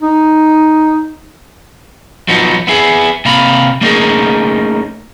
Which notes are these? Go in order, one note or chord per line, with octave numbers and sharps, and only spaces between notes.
D#4
F3 F#3 B3 D#4
B3 E4 G#4
C3 A#3 F5 B5
A3 A#3 C#4 D#4 G#4 A#4